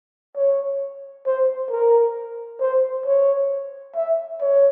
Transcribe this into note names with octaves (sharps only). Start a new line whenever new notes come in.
C#5
C5
A#4
C5
C#5
E5
C#5